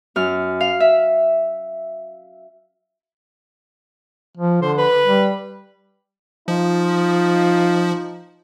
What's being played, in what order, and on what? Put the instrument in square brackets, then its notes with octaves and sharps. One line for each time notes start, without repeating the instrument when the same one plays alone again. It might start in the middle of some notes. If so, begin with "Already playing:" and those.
[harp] F#2 F6
F5
E5
[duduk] F3
[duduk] D3 [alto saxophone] C5
[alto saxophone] B4
[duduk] G3
[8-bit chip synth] F3 [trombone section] D#4 F4